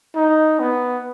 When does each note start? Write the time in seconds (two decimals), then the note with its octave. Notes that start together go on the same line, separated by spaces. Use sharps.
0.16 D#4
0.59 B3